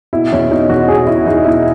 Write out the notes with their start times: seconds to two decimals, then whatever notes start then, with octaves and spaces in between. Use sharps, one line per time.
0.13 B2 E4
0.32 E2 C#4
0.51 B2 D#4
0.69 E2 F#4
0.88 B2 G#4
1.07 B2 E4
1.26 E2 D#4
1.44 B2 E4